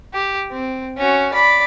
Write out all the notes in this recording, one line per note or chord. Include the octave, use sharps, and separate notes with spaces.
G4
C4
C#4 F#4
D5 B5